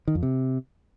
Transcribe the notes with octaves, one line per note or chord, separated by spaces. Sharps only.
D#3
F2
C3